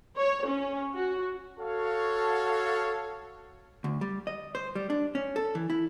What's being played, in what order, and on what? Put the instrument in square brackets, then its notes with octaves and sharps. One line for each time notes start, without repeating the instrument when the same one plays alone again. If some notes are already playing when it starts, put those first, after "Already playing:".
[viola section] C#5
C#4
F#4
[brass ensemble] F#4 A4 C#5 F5
[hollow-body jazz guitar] D2
G3
D#5
C5
G3
D4
C#4
A4
E3
E4